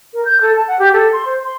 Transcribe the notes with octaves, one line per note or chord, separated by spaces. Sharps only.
A#4
G6
A4
A5
F#5
G4
A4
C6
C5
C6